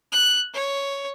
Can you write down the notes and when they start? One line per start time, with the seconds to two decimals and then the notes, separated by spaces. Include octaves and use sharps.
0.12 F#6
0.54 C#5